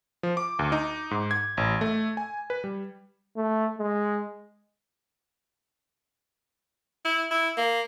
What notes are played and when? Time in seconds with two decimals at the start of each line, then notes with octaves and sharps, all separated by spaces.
0.23 F3
0.37 D6
0.59 D2
0.72 D#4
1.11 G#2
1.31 G#6
1.57 A1
1.81 A3
2.17 G#5
2.50 B4
2.64 G3
3.36 A3
3.79 G#3
7.05 E4
7.31 E4
7.57 A#3